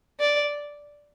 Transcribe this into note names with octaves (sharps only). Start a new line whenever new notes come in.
D5